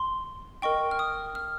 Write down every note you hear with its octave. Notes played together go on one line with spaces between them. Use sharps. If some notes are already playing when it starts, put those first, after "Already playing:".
Already playing: C6
A#4 D#5 G5 C#6
F6
D#6
F6